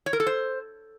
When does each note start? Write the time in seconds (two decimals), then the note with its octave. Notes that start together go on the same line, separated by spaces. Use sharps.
0.06 C#5
0.13 A#4
0.20 A4
0.27 C5